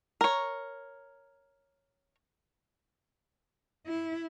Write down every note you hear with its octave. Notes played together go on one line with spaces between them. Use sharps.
A#4 C#5
E4